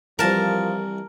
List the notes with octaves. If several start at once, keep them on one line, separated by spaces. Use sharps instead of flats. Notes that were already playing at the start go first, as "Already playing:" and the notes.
C2 E3 F3 A#4 A5